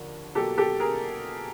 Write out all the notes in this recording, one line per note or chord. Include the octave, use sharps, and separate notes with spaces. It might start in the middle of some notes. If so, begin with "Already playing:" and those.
Already playing: D#2 D3 F3
B2 F#3 A#3 G4 A4
G4 A4
G#4 A#4